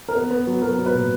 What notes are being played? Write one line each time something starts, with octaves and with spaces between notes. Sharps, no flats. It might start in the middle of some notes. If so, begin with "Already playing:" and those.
A#4
B3 B4
B3
F#3
F#3 A#4
F#3
B4
A#2